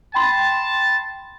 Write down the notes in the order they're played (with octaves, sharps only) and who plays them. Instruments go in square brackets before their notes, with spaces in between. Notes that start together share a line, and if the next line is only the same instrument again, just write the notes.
[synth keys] G5 B5 C6 [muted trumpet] A5